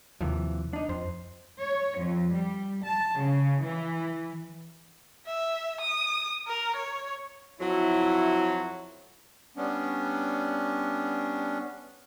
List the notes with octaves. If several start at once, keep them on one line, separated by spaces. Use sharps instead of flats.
D#2 C3 E3 F3
D4 D#4
F2 C5
C#5
F2
G3
A5
C#3
E3
E5
D#6
A#4
C#5
F2 F#3 E4
G3 B3 C#4 D4